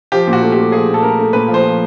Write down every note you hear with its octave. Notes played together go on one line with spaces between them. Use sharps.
F3 G4
A#2
F#4
A3
G4
A3
F3 G#4
A#2
A4
A3 A#4
A3
A#2 B4
F3
C5
F3